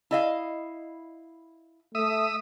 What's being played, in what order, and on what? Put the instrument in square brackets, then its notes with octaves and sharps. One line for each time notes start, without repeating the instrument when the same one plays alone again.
[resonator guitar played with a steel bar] E4 D#5 F5
[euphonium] A3 [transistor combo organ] E5 D#6